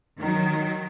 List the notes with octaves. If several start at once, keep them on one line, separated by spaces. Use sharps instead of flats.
D#3 F#3